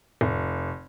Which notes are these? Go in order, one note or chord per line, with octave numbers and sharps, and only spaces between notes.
F1